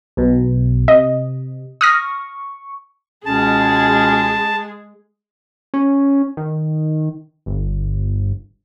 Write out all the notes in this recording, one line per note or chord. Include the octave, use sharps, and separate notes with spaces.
B1 B2
C3 D#5
C#6 D#6 F6 A#6
C#2 B2 G#3 C#4 G#4 A5
C#4
D#3
G1